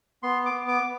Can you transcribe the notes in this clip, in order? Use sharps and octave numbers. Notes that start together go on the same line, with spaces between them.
B3 C6
D6
B3
D6
B3